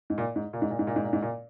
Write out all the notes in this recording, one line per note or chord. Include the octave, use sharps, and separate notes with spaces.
G#2
A#2
G#2
A#2
G#2
A#2
G#2
A#2
G#2
A#2
G#2
A#2